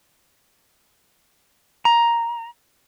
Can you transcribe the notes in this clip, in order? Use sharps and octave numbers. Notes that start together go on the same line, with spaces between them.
A#5